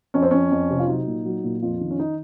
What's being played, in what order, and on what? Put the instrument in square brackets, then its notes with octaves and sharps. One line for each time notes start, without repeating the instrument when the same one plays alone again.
[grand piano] F2 C#4
C4
F2 C#4
F2
C3
F4
F#3 D#4
A#2
F#3
A#2
F2 F4
D#3
C#4
D#4